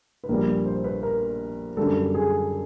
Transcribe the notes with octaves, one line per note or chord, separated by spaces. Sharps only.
B4
A#1 A#2 G3 A#4
C5
B4
A#4
F#2 D3 G3 A4
G#4